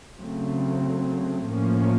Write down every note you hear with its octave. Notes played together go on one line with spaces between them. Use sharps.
C#3 F#3 A3 C4
A2 F3 A#3 C#4